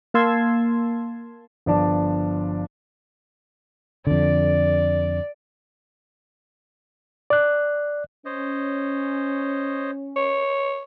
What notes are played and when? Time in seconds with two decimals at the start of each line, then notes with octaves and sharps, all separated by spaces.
0.14 A#3 F5 A5 C6 E6 G#6
1.66 G1 F3 D4 D5 A5
4.07 F2 D3 D5
7.30 D5 F#6
8.25 C#4 C5 C#5 D#5
10.16 C#5